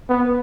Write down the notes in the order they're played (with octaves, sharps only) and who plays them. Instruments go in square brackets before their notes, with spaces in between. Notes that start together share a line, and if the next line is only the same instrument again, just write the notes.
[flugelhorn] B3